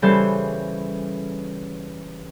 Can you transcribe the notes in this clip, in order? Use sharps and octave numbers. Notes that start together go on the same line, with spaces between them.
C#3 E3 G3 A4 C5